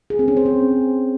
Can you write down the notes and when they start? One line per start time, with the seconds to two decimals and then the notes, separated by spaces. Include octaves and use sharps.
0.10 G#4
0.19 C4
0.28 C#4
0.37 C5
0.46 C4